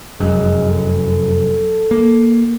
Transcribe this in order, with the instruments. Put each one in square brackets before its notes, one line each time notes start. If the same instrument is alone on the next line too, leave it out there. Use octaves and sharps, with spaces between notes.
[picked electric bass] F1 F#2 [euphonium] G#3
[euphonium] A4
[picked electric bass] A#3